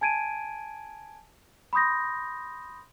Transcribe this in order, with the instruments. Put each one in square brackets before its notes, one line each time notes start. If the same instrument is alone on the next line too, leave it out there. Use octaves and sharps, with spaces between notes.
[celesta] G#5 A5 G#6 D7 D#7
B5 C6 D#6 G6 A#6